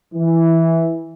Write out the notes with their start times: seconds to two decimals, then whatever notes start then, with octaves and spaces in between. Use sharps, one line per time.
0.13 E3